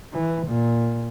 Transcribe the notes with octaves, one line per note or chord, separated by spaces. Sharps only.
E3
A#2